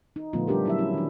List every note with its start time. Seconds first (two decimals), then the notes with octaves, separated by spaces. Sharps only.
0.16 D#4
0.33 A#2 D3 F3 A3 B3 F4
0.48 G3 D4 G4 A#4
0.65 F#3 E4 E5
0.78 C#4 E4
0.94 D#3 D4